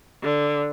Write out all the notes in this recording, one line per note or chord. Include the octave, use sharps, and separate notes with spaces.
D3